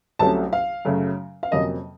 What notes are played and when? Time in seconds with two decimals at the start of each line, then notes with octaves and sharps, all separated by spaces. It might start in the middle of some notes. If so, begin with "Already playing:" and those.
0.19 C2 C3 F#3 A3 C#4 A5
0.53 F5
0.85 F#2 C#3 F#3 A3
1.43 F5
1.51 F2 C3 F#3 A#3 C#4 D#5